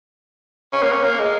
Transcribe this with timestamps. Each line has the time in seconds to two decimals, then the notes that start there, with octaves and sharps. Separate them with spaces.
0.73 C#4
0.82 A#3
0.92 C#4
1.03 A#3
1.19 G#3